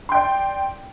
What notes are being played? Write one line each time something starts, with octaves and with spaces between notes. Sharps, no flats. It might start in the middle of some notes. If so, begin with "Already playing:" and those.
D5 G5 C6